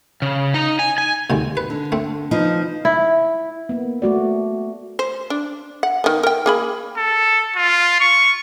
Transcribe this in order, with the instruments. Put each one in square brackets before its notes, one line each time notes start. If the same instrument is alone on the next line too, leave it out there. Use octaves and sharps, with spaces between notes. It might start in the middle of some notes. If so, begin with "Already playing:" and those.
[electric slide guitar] C#3
D#4
G#5
G#5
[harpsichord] D2 G#2 C3
B4
[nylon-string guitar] D3
[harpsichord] A3 C4
[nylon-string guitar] F3 B3 D#4
[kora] E4
[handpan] A#3 B3
A3 F#4 D5
[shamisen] C5
D4
F#5
D#3 B3
A#4 G5
A#3 G#4 B5
[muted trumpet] A4
F4
C#6